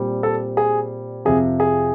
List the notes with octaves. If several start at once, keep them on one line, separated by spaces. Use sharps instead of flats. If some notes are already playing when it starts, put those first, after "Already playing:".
Already playing: A#2 G3 C4
A4
G#4
F2 C3 F3 G#4
G#4